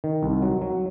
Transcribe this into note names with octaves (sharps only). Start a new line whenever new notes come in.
D#3
C2
F#3
F#3